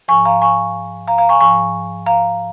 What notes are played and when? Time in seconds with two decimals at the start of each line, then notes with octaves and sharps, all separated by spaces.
0.08 G#2 F3 G#5 C#6
0.25 F5 A#5
0.42 G#5 C#6
1.08 F5 A#5
1.18 F5 A#5
1.29 G#5 C#6
1.41 G#2 F3 G#5 C#6
2.06 F5 A#5